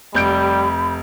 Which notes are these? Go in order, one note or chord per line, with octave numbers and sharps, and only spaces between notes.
F1 G3 B5 G6 D7